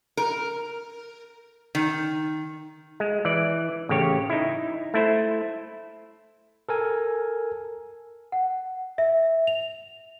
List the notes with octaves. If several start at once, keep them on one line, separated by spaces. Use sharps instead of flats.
A#4
D#3
G#3
E3 D5
A1 C#3 G4 C#5
D#4 E4
A3 E4 C5
A4 A#4 G#5
F#5
E5
F7